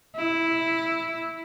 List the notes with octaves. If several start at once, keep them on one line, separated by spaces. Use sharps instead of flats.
E4